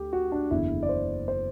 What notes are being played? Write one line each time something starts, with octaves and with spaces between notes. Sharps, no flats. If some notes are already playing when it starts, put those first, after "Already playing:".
Already playing: D2 G4
F#4
D4
F#1 E2 D3 E4
D5
C5
C5